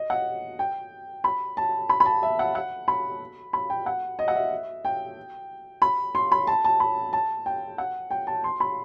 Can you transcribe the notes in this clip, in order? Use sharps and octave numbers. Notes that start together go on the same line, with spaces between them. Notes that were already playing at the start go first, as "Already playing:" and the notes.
Already playing: D#5
F#5
G5
B5
A5
B5
B5
A5
E5
F#5
F#5
B5
B5
G5
F#5
D#5
F#5
E5
G5
B5
C6
B5
A5
A5
B5
A5
G5
F#5
G5
A5
C6
B5